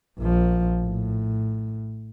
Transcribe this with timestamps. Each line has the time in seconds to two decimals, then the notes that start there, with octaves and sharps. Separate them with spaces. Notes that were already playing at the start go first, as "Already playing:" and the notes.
0.18 A#1 F3
0.82 A2